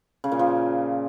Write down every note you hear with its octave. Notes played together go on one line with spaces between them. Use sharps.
C#3
A#2
F3